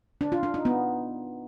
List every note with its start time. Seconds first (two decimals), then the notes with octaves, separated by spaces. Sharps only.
0.21 D4
0.32 F4
0.43 D4
0.54 D#4
0.65 B3